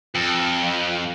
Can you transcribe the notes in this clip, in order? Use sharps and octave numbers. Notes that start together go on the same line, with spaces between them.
F2